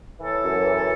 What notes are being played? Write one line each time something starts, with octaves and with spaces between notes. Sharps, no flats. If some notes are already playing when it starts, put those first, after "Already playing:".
E3 A4 C#5
F#2
E3